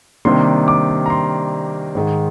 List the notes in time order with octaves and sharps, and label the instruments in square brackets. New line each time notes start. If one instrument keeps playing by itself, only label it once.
[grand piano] C3 D#3 G3 A#3 D4 C6
D6
A#5
C6
G#2 D#3 G#3